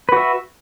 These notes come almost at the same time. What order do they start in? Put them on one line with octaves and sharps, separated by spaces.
B4 F#4 E5